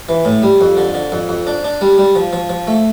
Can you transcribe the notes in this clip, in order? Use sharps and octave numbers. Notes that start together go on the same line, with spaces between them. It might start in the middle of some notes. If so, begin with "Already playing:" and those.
E3
A2
G3
F2
D3
D3
F2
F2
D4
D4
G3
G3
F3
F3
F3
A3